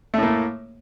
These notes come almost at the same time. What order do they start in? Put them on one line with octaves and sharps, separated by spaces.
A3 A2 A#3